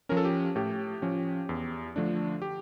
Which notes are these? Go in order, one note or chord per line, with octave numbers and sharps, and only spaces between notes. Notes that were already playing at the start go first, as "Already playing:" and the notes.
F3 C#4 A#4
A4
G4
A2 G4
F3 C#4
E2
D3 F3 A3 D4
G4